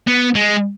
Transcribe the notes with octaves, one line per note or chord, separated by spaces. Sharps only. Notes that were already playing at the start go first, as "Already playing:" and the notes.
B3
G#3